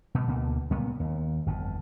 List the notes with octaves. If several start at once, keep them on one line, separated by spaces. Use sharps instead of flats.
B2 G3
D2 B2 D3 A#3
C#2 A#2 G3 B3
D#2
G1 F2